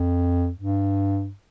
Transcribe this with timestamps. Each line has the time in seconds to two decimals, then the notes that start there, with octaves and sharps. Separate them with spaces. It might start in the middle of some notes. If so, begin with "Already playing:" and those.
Already playing: F2
0.57 G2